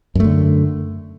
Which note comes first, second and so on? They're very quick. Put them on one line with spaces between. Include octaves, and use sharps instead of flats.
F#2 A3 D3